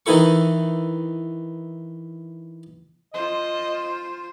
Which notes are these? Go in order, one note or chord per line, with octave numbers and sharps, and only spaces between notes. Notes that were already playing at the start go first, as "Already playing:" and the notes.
D#3 E3 D#4 E4 A4 C#6
F4 C5 D#5